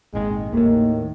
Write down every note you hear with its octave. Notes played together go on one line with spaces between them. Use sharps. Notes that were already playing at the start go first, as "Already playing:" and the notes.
D#1 G#1 D#3 G#3
D#2 A2 D#3 A#3